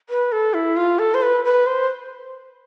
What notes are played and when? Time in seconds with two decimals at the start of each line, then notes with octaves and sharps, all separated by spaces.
0.09 B4
0.32 A4
0.54 E4
0.77 F4
0.99 A4
1.14 C5
1.22 B4
1.44 B4
1.67 C5